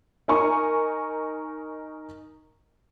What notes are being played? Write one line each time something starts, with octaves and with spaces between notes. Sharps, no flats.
D#4 A#4 G#5 A#5 C#6